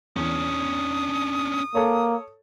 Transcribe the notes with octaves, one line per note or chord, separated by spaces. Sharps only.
E2 C#4 D4 D#6
A#3 A4 C#5